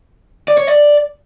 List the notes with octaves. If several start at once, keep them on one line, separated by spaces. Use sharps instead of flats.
D5
C#5
D5